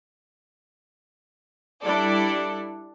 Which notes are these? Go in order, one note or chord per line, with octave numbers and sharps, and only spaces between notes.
G3 D4 E4 A4 D5